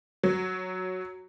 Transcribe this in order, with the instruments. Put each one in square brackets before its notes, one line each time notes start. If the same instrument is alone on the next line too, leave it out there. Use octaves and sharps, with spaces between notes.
[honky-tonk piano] F#3